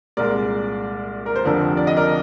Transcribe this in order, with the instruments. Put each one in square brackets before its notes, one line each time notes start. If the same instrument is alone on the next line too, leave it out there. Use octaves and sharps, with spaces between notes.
[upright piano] C2 A#2 G#3 A#4 D5
A#4
C5
F1 F2 D3 F3 A#4 D5
D5
D#5
A#4 D5